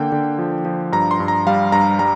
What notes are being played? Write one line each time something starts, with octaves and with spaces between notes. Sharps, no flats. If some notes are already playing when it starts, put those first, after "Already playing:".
Already playing: D3 A#3 G5
D3
F3
F3
G2 A#5
C6
G2
A#5
G3 F5
G2 A#5
G3 A#5